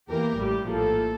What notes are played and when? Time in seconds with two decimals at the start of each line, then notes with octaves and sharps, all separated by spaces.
0.11 E2 E3 A#3 G4 A#4
0.40 A1 A2 G3 G4
0.69 A#1 A2 F3 A#3 A4